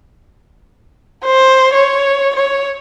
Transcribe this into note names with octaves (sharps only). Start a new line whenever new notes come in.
C5
C#5
C#5